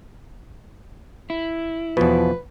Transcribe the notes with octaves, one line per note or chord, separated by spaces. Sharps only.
E4
E2 B2 F3 B4